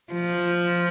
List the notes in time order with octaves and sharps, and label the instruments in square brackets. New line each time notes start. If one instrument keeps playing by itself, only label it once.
[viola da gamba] F3